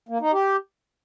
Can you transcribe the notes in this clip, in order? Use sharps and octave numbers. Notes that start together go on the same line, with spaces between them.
A#3
D#4
G4